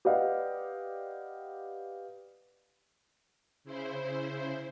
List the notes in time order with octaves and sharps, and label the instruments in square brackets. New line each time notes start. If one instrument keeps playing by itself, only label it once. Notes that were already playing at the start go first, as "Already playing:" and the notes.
[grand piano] G4 B4 D5 D#5 F5 F#5
[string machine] C#3 E4 C5